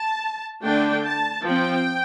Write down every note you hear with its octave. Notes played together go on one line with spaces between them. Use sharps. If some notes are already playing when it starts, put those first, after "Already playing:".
Already playing: A5
D3 A3 D4 G5
A5
F3 C4 G5